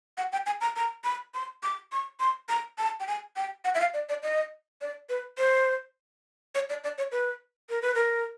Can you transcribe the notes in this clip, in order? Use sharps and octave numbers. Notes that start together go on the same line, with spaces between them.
F#5
G5
G#5
A#5
A#5
B5
C6
D6
C#6
C6
A#5
A5
G5
G#5
G5
F#5
E5
F5
D5
D5
D#5
D5
B4
C5
C#5
D5
D5
C#5
B4
A#4
B4
A#4